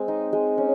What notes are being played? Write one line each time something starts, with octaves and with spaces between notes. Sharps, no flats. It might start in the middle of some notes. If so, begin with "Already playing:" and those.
Already playing: G#3 C4
D#4
G#3
C#4